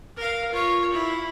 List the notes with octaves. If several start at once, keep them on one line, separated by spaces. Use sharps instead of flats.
A#4 F5
F4 C#5
E4